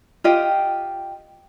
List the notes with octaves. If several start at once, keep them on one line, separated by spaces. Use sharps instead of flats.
F4 G4 D#5 G5